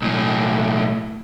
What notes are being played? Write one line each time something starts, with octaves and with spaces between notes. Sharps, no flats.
B1 A2